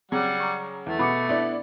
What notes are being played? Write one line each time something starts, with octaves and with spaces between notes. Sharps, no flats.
C#3 F#3 G3 F#5
A#5 C#6
E2 A3
B2 B5 D6 C#7
B3 D4 E4 D5